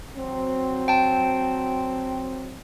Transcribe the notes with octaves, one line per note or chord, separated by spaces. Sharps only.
F#3 C4
G5 A5